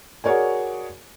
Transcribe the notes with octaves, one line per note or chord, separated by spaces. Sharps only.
F#4 G#4 A#4 C#5 D5 G#5